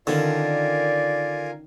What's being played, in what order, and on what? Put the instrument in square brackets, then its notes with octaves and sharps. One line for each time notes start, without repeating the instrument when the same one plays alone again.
[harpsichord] D3 [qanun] D#3 C#4 D4 [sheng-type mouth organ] F4 A#4 G#5 [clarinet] D5